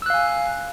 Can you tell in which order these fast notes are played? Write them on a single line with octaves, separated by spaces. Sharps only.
E6 F#6 F5 G#5